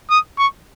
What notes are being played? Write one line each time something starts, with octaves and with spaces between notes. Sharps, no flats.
D#6
C#6